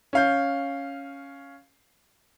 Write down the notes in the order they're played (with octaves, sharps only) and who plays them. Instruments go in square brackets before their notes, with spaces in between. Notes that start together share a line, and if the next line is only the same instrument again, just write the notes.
[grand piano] C#4 F5 G6